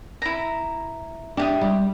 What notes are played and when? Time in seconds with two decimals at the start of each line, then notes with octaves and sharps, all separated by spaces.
0.22 E4 A#5
1.37 D4 G4 E5 D#6
1.61 G3